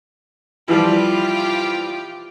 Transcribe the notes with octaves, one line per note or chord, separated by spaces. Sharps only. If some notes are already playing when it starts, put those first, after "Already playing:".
E3 F3 G3 F4 G4